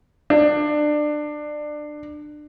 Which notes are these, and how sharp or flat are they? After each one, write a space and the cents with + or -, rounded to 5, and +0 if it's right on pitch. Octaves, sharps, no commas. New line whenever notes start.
D4 +25